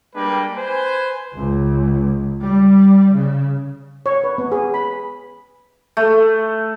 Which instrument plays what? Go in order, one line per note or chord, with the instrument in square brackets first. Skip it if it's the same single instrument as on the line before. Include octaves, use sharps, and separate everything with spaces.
[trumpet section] G3 G#3 A#3 D4 B4 G5
B4 C5 G#5
[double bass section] C#2
G3
C#3
[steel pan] C#5
B4
B3
G#4
B5
[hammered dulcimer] A3